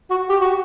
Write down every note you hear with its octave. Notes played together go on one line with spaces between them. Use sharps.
F#4
G4
F#4